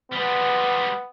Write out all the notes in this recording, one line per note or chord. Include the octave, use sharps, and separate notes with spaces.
G3 G#3 B3